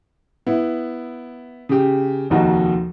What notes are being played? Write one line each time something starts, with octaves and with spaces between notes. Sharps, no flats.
B3 E4
C#3 G4
F1 D#2 D#4 F#4